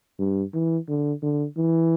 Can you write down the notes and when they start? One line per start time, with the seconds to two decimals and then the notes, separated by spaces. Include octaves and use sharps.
0.19 G2
0.53 E3
0.88 D3
1.22 D3
1.57 E3